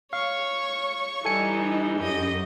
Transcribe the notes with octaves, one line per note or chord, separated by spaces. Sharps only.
C#5 F5 C#6
E3 G3 D#4 A4 G#5 C#7
F#2 G4 D#5